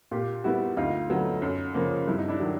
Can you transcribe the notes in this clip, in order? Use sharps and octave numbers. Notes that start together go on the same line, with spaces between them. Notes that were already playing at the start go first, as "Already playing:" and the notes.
A#2 F4 G4
G3 B3 E4 F#4
D2 D#4 F4
D3 F#3 B3
F#2
C#3 F3 A#3
G2 E4
D#4
D4 E4
D#3 F#3